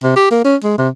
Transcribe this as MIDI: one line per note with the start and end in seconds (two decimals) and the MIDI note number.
0.03 0.15 48
0.16 0.27 67
0.31 0.43 58
0.45 0.56 61
0.64 0.76 56
0.78 0.89 48